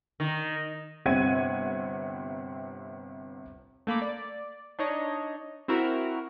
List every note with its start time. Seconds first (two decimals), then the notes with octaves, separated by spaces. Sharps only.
0.20 D#3
1.06 G1 C3 C4 F#5 G#6 D#7
3.87 A3 A#3 B5 D6
4.02 D5
4.79 D4 D#4 C#5 D#5
5.68 C4 E4 F#4 A#4